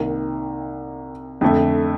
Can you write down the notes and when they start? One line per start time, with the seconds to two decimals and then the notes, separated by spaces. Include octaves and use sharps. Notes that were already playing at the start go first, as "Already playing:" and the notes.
Already playing: C2 C3 D#3 A#3
1.41 F2 D3 A3